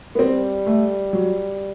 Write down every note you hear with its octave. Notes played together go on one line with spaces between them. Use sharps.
B3
G3 C4
A3
F#3